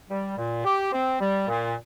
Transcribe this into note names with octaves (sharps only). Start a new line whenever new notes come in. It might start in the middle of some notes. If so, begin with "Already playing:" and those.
G3
A#2
G4
C4
G3
A#2